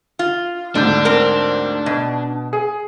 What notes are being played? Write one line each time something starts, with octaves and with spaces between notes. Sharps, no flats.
F4
D2 G#2 D3 D4 G6
C4 A#4
B2
G#4